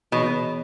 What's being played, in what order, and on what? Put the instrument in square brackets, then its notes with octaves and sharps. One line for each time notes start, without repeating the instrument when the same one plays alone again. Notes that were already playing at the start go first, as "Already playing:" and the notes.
[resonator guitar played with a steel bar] B2 [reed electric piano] E3 B3 D#4 G#4 C#5